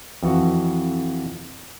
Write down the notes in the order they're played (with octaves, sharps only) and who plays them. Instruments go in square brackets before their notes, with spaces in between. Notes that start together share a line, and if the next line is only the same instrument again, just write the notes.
[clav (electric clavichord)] F2 E3 F#4